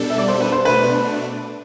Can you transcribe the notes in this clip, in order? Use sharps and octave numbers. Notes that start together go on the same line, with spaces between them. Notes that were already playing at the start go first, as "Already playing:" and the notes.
Already playing: B2 G3 D4 A4
E5
D5
C5
B4
C5
B2 A3 D4 B4